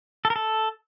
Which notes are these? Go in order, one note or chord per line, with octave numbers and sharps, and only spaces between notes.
A4
A#4
A4